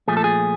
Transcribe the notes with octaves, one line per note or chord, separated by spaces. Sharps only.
A#2 F3 A3 G#4
A4
G#4